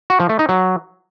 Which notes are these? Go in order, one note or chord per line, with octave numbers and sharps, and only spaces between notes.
F#4
F3
A3
D#4
F#3